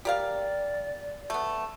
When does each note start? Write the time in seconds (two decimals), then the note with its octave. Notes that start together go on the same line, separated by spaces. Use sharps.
0.05 G4 A#4 D5 F5
1.30 A3 B3